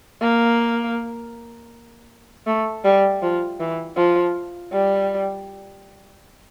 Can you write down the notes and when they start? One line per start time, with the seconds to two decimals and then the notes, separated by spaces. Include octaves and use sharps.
0.21 A#3
2.47 A3
2.84 G3
3.22 F3
3.60 E3
3.96 F3
4.72 G3